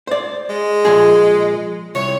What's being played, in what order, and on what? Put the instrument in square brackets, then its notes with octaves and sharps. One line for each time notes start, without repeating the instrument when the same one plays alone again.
[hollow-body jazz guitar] C5 D5
[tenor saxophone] G#3
[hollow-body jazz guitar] A#2 F3 G#4
[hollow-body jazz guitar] C2 [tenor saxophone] C#5